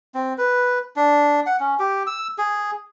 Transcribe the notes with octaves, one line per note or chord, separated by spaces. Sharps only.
C4
B4
D4
F#5
C#4
G4
E6
G#4